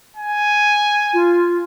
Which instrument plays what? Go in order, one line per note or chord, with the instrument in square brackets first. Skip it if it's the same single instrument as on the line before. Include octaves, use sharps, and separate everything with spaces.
[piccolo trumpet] G#5
[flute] F4